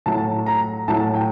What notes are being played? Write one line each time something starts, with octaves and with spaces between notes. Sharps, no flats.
A2 F#3 A5
A#5
A2 F#3 A5
G5